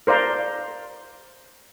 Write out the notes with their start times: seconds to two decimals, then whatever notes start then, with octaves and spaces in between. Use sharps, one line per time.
0.07 A#4 C5 D5 F5 A#5